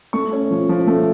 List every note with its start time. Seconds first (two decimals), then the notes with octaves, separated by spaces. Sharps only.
0.13 A3 C#6
0.32 C#4
0.51 F3
0.69 F3
0.87 A3